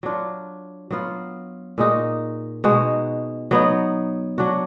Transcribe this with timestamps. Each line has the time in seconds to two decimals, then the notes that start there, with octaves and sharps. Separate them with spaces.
0.03 F#3 D4 F4
0.91 F#3 B3 F4
1.78 A#2 G#3 D#4 F#4
2.64 B2 G#3 D#4 F#4
3.51 F#3 B3 D#4
4.38 F#3 D4 F#4